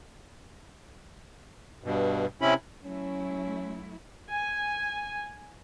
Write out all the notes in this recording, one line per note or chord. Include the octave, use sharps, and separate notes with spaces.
G2 B2
C3 C#4 E4 B5
F#3 A3 C#4 E4
G#5